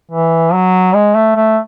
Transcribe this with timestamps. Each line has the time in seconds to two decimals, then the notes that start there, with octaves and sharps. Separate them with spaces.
0.11 E3
0.53 F#3
0.94 G#3
1.15 A3
1.36 A3